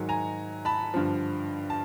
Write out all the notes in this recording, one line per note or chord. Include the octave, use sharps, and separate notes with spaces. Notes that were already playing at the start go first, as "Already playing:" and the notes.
Already playing: G#2 D#3 F#3
G#5 A#5
A5 B5
G2 D3 F3
A5